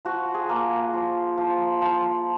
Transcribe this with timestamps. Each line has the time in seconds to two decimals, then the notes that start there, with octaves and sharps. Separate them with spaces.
0.05 F3 F#4
0.34 G#4
0.49 A#3
0.93 F3
1.38 F3
1.82 F3